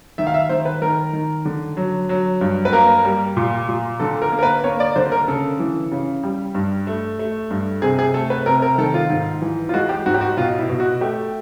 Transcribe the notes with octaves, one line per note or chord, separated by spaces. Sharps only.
D#3 E5
F5
E5
D#3 C5
B4
D#3 A#4
D#3
D3
F#3
F#3
G2
B4
A#3 A#4
G3
A#2
A#2
D3 A4
A#4
A#3
A#4
B4
A#3 C#5
D5
D3 C5
A#4
C#3 A4
E3
C#3
G3
G2
A3
A3
G2
C3 G#4
G#4
A3 A4
B4
C3 A#4
A#4
D#3 A4
F4
G#2
E3
F4
G#3 F#4
G4
G#2 F#4
G4
F#4
B2 F4
E4
B2
F#4
A3 G4